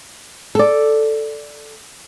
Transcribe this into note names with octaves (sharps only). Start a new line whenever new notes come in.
A4 D5